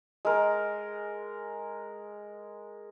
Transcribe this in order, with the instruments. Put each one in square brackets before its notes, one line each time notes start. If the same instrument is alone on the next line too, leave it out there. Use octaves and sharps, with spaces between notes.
[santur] G#3 A#4